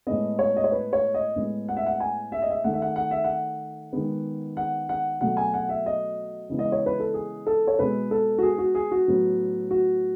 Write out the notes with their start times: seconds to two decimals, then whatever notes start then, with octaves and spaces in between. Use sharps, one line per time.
0.07 A2 G#3 B3 D#5
0.39 C#5
0.56 D#5
0.64 C#5
0.72 B4
0.93 C#5
1.14 D#5
1.36 A2 G#3 B3
1.68 F#5
1.77 E5
1.86 F#5
2.00 G#5
2.32 E5
2.42 D#5
2.50 E5
2.64 D#3 A3 F#5
2.73 E5
2.82 F#5
2.96 F#5
3.11 E5
3.24 F#5
3.93 D#3 G#3 B3
4.57 F#5
4.89 F#5
5.21 B2 F#3 A3 F#5
5.37 G#5
5.54 F#5
5.69 E5
5.86 D#5
6.49 C#3 E3 G#3 B3
6.59 D#5
6.72 C#5
6.86 B4
7.00 A4
7.14 G#4
7.47 A4
7.67 C#5
7.79 B2 G#3 B3 B4
8.11 A4
8.38 F#4
8.43 G#4
8.58 F#4
8.75 G#4
8.91 F#4
9.07 A2 F#3 B3
9.71 F#4